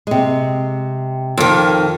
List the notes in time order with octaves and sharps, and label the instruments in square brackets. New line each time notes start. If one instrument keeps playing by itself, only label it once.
[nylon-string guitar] C3 G#3
[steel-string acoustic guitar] F2 D#3